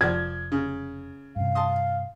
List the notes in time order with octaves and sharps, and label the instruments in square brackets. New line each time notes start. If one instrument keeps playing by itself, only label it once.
[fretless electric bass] F1 [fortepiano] F3 D5 [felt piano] G#6
[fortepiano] C#3
[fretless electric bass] G2 C3 [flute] F5
[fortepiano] A5 C6 D#6